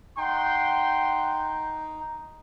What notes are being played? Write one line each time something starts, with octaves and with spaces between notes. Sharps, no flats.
D#4 F#5 G5 C6